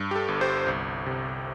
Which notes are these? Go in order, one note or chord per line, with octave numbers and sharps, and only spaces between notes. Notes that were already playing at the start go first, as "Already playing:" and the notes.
Already playing: G2
G4
A4
G1
G4 C5
C2
C3